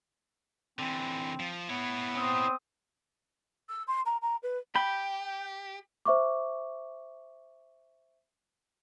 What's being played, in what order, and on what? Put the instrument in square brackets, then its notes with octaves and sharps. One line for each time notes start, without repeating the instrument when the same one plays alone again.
[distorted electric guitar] D3 E3 [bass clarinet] C4
[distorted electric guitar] F3
[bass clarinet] B3 [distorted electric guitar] E4 C#5
[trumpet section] C4 D#6
[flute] E6
C6
A#5
A#5
B4
[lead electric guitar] G4 [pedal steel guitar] G5 [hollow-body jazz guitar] B5
[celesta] C5 E5 C#6 D6